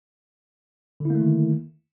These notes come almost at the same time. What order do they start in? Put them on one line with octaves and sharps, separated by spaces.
D3 E4 A#3 A3 D#3